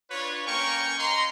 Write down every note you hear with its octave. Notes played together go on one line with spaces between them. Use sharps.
D4 F4 B4 C#5
A#3 C#4 A#4 G5 G#5 C#6
D#5 A#5 C6